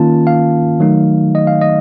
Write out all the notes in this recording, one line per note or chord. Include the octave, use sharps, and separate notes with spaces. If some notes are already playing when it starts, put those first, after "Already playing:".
Already playing: D#3 A#3 C#4 F4 A5
F5
D#3 F#3 A3 D#4
D#5
F5
D#5